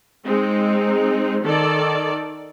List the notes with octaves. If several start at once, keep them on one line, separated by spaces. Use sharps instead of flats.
G#3 C4 D#4
D#3 A4 D5